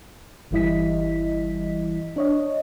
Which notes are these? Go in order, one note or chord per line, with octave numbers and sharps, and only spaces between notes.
G1 E3 G3 E4 D#5 B6
D4 C#5 D#5